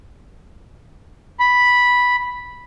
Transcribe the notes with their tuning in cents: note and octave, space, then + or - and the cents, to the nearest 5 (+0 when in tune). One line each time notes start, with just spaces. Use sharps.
B5 -5